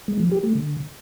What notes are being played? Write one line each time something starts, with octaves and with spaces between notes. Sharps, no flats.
G#3
F3
G4
A3
D3